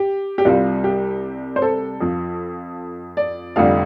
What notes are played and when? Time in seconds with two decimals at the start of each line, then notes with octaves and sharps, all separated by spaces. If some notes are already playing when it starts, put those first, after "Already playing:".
Already playing: G4
0.38 G4
0.45 C2 C3 G3 F4
0.84 G4
1.56 C5
1.62 A4
2.01 F2 F3
3.17 D5
3.56 F1 F2 D3 G3 F5